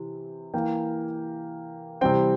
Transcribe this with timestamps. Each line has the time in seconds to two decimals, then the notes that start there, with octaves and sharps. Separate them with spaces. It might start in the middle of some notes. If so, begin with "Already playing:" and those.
Already playing: C3 E3
0.54 E3 A#3 G5
2.01 C3 E3 G3 C4 G5